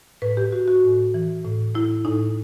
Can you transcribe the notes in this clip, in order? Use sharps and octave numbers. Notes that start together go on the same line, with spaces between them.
A2 B4
G4
A2 F#4
F#4
A2
E3
A2
A2 E4
A2 D#4